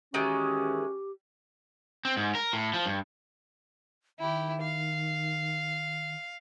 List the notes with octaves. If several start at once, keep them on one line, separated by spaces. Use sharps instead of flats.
D#3 E3 G#3 C#4 F#4 G4
C4
G#2
A#4
A2
F3
G2
D#3 E4 G4
F5